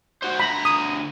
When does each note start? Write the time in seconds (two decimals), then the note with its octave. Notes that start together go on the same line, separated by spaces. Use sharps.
0.23 F#4 C5
0.40 D2 A#5 B5
0.65 D#6